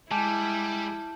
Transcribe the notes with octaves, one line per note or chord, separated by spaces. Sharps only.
G3 G#3 E4 G#5 A5 D6 G6